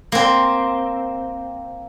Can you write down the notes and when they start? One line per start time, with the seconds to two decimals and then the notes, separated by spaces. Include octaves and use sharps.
0.12 A#3 C4